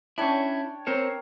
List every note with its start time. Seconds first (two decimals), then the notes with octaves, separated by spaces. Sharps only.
0.18 C#4 D4 E4 C#5 G5
0.87 C4 A#4 C5 C#5